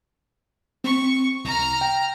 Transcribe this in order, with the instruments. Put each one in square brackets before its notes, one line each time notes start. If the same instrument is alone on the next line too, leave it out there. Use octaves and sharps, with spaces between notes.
[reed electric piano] C4 [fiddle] C#6
[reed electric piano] C2 [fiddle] A#5 F6
[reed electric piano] G5